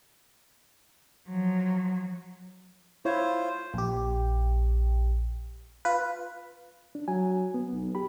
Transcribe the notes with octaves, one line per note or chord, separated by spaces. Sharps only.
F3 F#3
E4 F4 C5 C#5
A#1 G4
F4 B4
D4
F#3 G#5
B3
B1
G4 B5